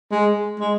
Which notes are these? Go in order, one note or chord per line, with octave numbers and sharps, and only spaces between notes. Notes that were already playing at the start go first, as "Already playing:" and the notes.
G#3
G#3